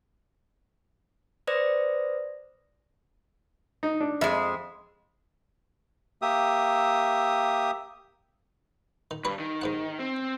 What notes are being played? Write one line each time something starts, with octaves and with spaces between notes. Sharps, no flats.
B4 C5 D5 D#6 A#6
D#4
D4
F2 G#3 E5
A#3 G4 E5 D#6
D#3
G2 B4 C#5 B5
D#3
D#2 G#2 F#5
C4